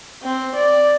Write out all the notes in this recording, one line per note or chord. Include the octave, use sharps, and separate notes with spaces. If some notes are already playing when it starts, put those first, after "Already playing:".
C4
D5